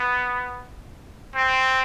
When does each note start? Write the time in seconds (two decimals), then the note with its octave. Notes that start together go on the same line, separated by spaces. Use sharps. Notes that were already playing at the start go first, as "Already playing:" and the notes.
Already playing: B3
1.36 C4